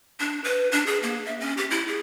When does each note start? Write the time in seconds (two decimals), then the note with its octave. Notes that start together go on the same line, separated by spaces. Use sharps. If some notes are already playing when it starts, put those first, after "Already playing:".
0.20 D4
0.44 B4
0.72 D4
0.86 G#4
1.03 A#3
1.26 E5
1.40 C#4
1.57 G4
1.70 E4
1.88 G#4